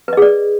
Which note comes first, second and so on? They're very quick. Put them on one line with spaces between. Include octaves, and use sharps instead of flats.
B4 D#5 G#4 D5